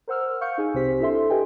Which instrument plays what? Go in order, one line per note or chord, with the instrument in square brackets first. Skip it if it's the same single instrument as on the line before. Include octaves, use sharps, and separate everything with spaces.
[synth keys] A#4 C5 F#5 E6 F6
F5 C#6 F6 G6 C#7
D#4 G#4 G#5
C2 C3 C4 G4 C5 B6
D4 E4 A4 E5 C6
G4 B4 D#5 G5 G#5